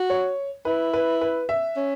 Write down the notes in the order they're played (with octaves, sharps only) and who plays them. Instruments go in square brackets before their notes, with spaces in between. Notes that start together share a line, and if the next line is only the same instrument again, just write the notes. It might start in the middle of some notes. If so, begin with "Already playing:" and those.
Already playing: [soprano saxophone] F#4
[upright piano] C#5
[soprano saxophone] E4 [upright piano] B4
[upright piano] B4
B4
E5
[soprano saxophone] C#4